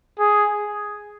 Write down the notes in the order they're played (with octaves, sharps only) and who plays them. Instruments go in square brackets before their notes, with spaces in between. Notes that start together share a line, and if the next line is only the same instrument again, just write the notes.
[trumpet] G#4